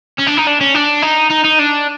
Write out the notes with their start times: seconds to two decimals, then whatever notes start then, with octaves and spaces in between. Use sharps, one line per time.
0.19 C#4
0.27 D4
0.38 D#4
0.47 D4
0.61 C#4
0.74 D4
1.03 D#4
1.31 D#4
1.45 D#4
1.59 D4